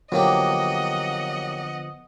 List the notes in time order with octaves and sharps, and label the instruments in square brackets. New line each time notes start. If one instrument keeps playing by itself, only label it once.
[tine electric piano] D3 F3 B3 [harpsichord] F#3 A#3 G4 [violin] D#5 F#5